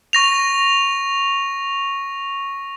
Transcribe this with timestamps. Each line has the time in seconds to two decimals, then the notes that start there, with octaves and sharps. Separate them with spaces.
0.13 C#6 A#6 F7